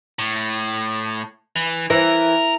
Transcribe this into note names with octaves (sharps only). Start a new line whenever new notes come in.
A2
E3
E3 A#4